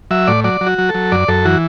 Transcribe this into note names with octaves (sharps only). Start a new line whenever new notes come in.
F#3 E5
A2 D5
F#3 D5
F#3
F#4
F#3
A4
F#3
F#2 D5
F#2 A4
E3 F#4